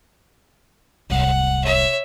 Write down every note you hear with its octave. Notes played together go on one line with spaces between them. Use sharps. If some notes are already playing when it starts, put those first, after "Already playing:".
D1 C2 F#5
C#5 E5